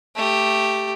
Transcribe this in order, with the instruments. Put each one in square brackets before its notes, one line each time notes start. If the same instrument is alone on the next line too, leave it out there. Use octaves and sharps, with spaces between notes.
[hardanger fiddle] A3 G4